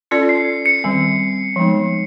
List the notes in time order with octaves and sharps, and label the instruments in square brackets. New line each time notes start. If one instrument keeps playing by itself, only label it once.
[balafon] C#4 F4 A4 D5 [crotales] C#7
[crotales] C7
C#7
[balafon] D#3 G3 C4
F3 G#3 B3 D#4